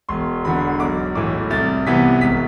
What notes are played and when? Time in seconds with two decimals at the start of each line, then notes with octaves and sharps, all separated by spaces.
0.09 E1 C6
0.44 E2 D3 B5
0.80 B1 D6
1.15 A2 E3 D6
1.50 C2 A6
1.86 C3 E3 B3 B6
2.21 E1 B6